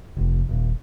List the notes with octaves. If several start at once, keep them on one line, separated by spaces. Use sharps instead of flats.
F1
D#1